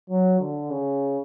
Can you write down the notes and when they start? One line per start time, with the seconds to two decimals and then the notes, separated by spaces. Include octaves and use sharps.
0.10 F#3
0.40 D3
0.70 C#3